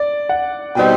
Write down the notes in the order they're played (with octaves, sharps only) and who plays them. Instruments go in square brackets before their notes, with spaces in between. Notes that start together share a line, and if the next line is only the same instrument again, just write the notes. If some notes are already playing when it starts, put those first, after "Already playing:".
Already playing: [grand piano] D5
F#5
[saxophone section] B2 G3 C4 D#4 [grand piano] G5